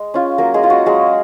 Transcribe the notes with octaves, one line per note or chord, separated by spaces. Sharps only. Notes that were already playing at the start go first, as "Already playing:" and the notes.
Already playing: G#3
C#4 F4
F#3 A#3 A#4
G#3 G#4
C#4 F4
F#4
F#3 G#3 G#4